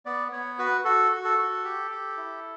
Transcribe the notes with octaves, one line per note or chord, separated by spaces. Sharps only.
B3 D5
B3 C#5
F#4 B4
F#4 A4
F#4
A4
F#4
G4
G4
E4